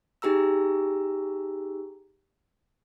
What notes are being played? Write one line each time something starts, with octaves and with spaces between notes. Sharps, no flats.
D#4 G4 G#4 A#5 E6